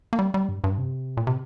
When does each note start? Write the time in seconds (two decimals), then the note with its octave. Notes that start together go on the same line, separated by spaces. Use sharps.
0.13 A#3
0.19 G3
0.34 G3
0.49 G2
0.64 G2
0.78 C3
1.17 A#2
1.27 C3